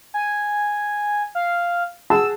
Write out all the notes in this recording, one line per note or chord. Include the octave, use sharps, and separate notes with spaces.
G#5
F5
G#4 F#5 A5 E6